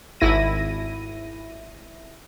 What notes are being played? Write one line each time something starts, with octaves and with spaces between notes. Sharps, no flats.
G#1 E4 A#6 D#7